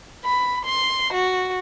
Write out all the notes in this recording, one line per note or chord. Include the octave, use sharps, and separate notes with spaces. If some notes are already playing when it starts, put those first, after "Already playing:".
B5
C6
F#4